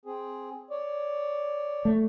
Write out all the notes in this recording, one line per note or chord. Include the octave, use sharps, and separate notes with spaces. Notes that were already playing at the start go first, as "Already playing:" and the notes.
C4 G#4
C#5 D5
A3